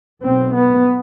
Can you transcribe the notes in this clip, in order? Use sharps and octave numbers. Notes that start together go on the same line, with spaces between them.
B1 B2 C4
B3